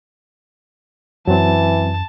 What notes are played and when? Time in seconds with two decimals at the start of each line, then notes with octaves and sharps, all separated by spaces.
1.27 F#2 E3 F#3 C4 A5